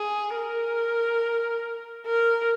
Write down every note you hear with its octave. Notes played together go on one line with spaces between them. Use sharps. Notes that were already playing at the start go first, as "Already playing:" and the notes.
Already playing: G#4
A#4
A#4